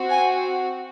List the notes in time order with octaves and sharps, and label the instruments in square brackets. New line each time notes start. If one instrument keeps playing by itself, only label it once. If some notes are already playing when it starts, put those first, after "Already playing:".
Already playing: [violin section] C4 F#4
G#5